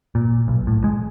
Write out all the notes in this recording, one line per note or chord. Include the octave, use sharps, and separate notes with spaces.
A#2
B1
A2
G#3